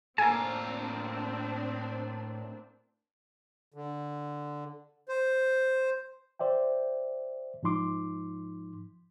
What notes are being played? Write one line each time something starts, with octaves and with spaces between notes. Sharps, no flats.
A2 A#3 C4 D4 F4 A4 G#5
D3
C5
C5 D5 E5 G5
G#2 F3 D#4 C6 D6